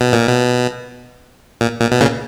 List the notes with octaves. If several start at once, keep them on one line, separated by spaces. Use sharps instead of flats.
B2
A#2
B2
A#2
A#2
B2
A#2 C#3